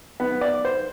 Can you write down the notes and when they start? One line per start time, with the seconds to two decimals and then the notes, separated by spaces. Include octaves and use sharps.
0.20 B3
0.41 D5
0.65 C5